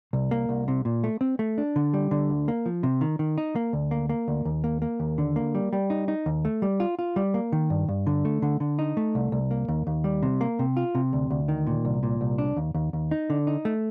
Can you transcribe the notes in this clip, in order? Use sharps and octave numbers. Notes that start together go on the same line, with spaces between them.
C2
A#3
C2
C3
A#2
A3
C4
A3
D4
D3
G3
D3
D2
A#3
F3
C3
D#3
D#3
D#4
A#3
D2
A#3
A#3
D2
D#2
A#3
A#3
D#2
D3
A#3
G3
G3
D#4
D#4
D#2
A3
G3
F4
F4
G3
A#3
D#3
G2
G2
D3
A3
D3
D3
D#4
A3
C2
C2
A#3
D#2
D#2
G3
C3
A#3
C3
F4
C3
D2
D2
D#3
A#2
C2
A#2
C2
D4
D#2
D#2
D#2
D#4
D3
D#4
A3